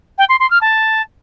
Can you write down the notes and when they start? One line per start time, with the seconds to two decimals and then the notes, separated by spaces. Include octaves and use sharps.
0.18 G5
0.29 C6
0.40 C6
0.51 F6
0.61 A5